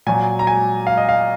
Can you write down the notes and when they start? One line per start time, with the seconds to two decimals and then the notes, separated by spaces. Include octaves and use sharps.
0.07 A#2 F#3 G#5
0.39 A#5
0.47 G#5
0.87 F5
0.97 D#5
1.09 F5